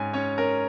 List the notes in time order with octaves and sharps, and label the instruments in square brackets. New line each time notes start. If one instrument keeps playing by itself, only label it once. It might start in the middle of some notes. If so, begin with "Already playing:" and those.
Already playing: [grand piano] G#2 C#4 G#5
C#4 C#5
C#4 A#4